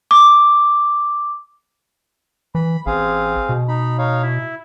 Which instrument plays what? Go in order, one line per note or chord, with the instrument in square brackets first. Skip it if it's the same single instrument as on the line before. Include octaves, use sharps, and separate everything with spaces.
[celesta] D6
[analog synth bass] E3 [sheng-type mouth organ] B5
[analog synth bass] A1 [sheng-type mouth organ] C4 G#4 F5
[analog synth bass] B2
[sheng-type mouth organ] D#4 B5
D#4 C#5 F5
E4 E5